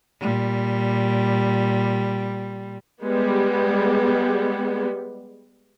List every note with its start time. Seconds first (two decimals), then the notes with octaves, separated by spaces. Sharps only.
0.20 A#2 G3
3.03 G3 G#3 B3